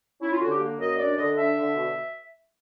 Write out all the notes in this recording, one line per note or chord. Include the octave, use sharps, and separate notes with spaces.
C#4 E4
F4
D3 F#4
G4
A#3
F#2 D#5
D4 D5
D3 D#5
D4 E5
D3
B2